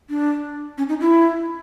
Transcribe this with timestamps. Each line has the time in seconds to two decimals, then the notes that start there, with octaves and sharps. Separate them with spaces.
0.10 D4
0.78 C#4
0.89 D#4
1.00 E4